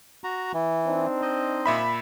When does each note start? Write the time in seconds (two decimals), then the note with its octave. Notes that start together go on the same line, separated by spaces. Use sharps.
0.24 F#4 A#5
0.54 E3
0.87 C4 D4 D#4
1.22 C5 D#5
1.66 A#2 E5 B5